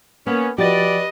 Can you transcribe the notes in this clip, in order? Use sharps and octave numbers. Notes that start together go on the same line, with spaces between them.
A#3 B3 C#4
F3 F#4 G4 B4 D5 D#5 A6